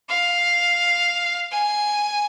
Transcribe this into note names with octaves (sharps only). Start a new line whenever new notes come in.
F5
G#5